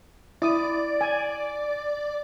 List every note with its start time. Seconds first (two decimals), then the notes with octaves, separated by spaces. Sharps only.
0.42 E4 D5 D#6
1.01 G#5